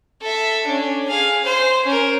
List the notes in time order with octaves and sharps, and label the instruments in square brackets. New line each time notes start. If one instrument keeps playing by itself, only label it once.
[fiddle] A4 E5
C#4 D4
G#4 F5
C5
C#4 A#4